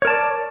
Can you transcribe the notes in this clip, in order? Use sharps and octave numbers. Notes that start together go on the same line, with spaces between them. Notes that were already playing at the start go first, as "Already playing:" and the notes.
A#4 C#5 D5 A5